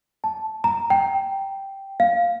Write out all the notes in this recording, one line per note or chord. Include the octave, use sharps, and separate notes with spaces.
A5
A#5
G5
F5